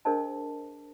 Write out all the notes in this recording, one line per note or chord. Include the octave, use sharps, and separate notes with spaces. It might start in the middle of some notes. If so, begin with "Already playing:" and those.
D4 G#4 A#4 C5 D#5 A5